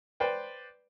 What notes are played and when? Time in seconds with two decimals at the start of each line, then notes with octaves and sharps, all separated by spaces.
0.20 B4 C5 D5 G5